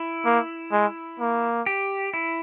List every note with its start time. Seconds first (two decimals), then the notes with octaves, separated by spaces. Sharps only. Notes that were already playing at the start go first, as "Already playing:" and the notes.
Already playing: E4
0.25 A#3
0.72 G#3
1.20 A#3
1.66 G4
2.14 E4